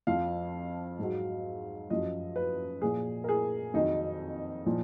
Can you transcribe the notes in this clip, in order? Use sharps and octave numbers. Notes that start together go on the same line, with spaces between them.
F2 F3 F5
G#2 F#3
F#2 F3 D#5
B4
A#2 F3 G#4
A#4
G#4
F2 D#3 F#3 D#4
A#2 F3